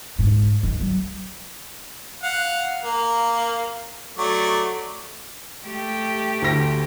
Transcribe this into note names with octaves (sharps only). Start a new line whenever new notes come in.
G#2
D#3
F#3
F5 F#5
A#3
F#3 A3 D5
A3 G4
D2 A#6